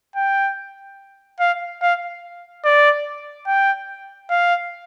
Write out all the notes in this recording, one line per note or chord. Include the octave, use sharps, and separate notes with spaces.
G5
F5
F5
D5
G5
F5